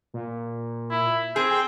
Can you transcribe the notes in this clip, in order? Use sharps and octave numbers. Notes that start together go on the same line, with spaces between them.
A#2
E4
C4 G#4
G5